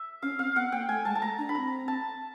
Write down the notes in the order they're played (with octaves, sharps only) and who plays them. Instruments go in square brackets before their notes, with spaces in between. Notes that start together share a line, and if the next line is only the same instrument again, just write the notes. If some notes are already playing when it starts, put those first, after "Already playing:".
Already playing: [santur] E5
[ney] C#4 [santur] F5
[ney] C4 [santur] F5
[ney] B3 [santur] F#5
[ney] A#3 [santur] G5
[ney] A3 [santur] G#5
[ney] G#3 [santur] A5
[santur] A5
[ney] A3 [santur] A#5
[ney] D4
[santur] B5
[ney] C4 [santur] A#5
[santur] A5